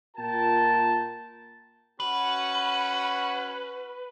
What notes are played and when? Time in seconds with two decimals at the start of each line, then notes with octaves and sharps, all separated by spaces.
0.17 A#2 F4 A#4 G5 A5
2.00 C#4 F#4 B4